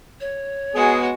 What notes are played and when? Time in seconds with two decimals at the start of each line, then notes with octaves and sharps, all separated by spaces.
0.21 C#5
0.75 G#3 B3 F#4 G#4